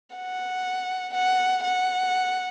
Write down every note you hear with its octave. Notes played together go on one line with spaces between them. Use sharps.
F#5
F#5
F#5